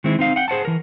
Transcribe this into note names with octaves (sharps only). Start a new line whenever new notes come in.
D#3 G#3 C4 E4
C4 D#4 F5
F#5 G5
G#4 C5 F#5 A5
E3 A#4